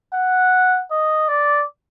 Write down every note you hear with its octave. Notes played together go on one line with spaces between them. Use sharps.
F#5
D#5
D5